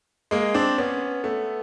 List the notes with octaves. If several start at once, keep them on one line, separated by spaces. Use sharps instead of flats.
G#3 A#3
C4 D4
B3 C#4
A3 B3